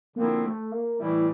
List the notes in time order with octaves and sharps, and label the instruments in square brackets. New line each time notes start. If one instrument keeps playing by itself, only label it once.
[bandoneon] D3 F3 C4 E4 [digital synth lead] A#3
[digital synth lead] A3
A#3
[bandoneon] A2 E3 G3 [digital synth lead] E4